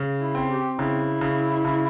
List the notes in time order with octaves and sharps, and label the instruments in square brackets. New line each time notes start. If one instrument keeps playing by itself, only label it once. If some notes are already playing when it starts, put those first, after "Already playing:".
Already playing: [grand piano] C#3
[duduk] E4
[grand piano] C4
[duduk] G4
[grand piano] C#3 [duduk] E4
[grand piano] C#3
C#3